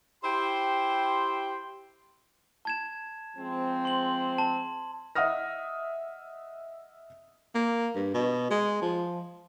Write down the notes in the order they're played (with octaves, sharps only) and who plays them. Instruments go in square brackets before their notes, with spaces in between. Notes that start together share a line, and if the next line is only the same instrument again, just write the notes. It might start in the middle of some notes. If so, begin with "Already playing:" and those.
[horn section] E4 G4 C5 G5 C6
[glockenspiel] A5 G#6 E7
[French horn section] F3 G#3 C4
[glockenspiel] C6 F#7
A5
[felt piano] D#5 E5 F#5 D#6 F6 A#6
[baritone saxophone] A#3
G2
B2
G#3
F3